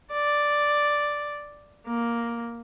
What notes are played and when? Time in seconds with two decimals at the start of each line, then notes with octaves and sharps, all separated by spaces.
0.12 D5
1.87 A#3